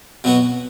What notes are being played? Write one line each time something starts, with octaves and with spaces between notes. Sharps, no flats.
B2 F#3 B3 F#4